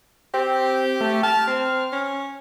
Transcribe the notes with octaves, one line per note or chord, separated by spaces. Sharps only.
C4 G4
A3
A5 F6
C4
C#4